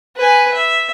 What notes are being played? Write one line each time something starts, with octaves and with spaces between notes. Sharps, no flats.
B4 G#5
E5